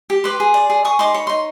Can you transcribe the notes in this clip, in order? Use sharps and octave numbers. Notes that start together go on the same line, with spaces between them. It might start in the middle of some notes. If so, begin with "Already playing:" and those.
G4
B4 C6 D6
G#4
D5
G#4
G#4 C#6 D#6
D#4 C6 D6
C#5 B5
D#4 C6